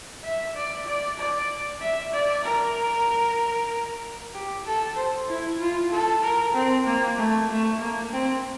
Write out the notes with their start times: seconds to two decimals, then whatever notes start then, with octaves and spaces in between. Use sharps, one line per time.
0.24 E5
0.55 D5
0.86 D5
1.18 D5
1.81 E5
2.13 D5
2.44 A#4
4.33 G4
4.65 A4
4.96 C5
5.28 E4
5.59 F4
5.90 A4
6.23 A#4
6.54 C4
6.85 A#3
7.17 A3
7.49 A3
7.79 A#3
8.12 C4